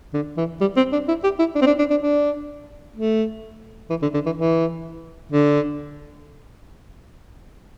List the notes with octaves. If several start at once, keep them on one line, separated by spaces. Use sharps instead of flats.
D3
E3
G3
C4
D4
E4
G4
E4
D4
C4
D4
D4
D4
D4
A3
E3
D3
D3
E3
E3
D3